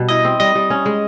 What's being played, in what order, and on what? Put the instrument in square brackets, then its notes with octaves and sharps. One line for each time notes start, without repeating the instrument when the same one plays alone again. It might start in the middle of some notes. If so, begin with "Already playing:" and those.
Already playing: [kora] B2 G3
[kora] E4 [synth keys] D#5
[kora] C4
[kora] G3 [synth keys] D#5
[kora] G3
C#4
G#3